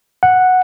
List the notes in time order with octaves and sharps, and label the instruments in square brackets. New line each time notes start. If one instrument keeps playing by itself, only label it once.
[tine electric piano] F#5